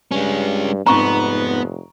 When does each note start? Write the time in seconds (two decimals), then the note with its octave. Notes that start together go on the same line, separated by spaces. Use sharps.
0.11 G2 G#3 C#4
0.86 F1 F2 G#2 B3 A#5 C#6